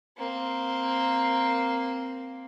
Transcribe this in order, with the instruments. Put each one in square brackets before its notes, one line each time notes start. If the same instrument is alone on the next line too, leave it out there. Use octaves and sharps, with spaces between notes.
[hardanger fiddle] A#3 C4